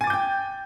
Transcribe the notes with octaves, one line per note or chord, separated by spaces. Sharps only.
G5 G#5 D6 G6 A6